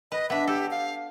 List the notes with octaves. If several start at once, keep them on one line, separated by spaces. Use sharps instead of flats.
B4 D#5
B3 D4 E5
G4 A4
F5